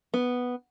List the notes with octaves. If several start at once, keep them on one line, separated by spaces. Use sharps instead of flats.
B3